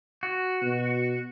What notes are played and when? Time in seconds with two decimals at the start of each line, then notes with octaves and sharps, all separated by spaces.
0.23 F#4
0.62 B2